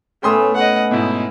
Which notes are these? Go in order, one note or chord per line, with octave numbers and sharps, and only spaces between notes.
A2 A3 B3 C#4 G5 C6 D#6
D#5 F#5
G#2 B2 E4